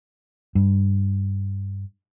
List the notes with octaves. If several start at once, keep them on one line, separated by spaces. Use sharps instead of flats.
G2